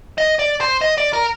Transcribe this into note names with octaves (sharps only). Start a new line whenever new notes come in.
D#5
D5
C5
D#5
D5
A#4